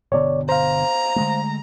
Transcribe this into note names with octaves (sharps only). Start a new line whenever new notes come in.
G1 B2 D3 C#5 D5
C5 F5 A#5
D3 G#3 A3